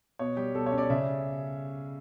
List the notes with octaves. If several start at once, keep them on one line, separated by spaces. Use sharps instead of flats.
B2 C#5
G3 G4
B2 A4
C#5
C#4
D5
C#3 E5